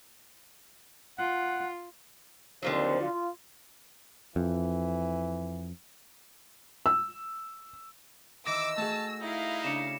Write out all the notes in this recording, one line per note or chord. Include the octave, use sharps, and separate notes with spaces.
F4 F#5
D#2 D3 F3 F#3 C4 C5
F4
F2 E3
E6
D#3 E3 D6 E6 A#6
A3 F#4 G#4 A5
D#4 E4 F5
C#3 D4 C#7 E7